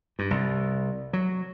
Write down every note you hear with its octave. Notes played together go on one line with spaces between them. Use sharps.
G2
C2
F#3